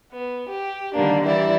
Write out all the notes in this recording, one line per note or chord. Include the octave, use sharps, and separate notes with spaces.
B3
G4
D3 D#3 G3 A#3 D4
E3 G3 E4 D5